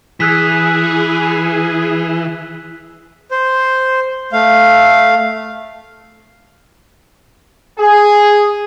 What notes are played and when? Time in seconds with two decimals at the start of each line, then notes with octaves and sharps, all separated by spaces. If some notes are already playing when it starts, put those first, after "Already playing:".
0.20 E3 G#4 E6 F#6 B6
3.31 C5
4.32 A3 F5
7.80 G#4